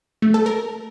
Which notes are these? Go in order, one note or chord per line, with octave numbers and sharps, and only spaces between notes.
A3
A4
A#4